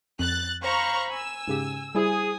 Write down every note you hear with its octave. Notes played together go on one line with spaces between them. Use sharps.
F2 F#6 A6
C5 F5 A#5 B5 C#6
G#5 E6
G#2 C#3 G4
G3 E4 G#4 C5 G#5 D#6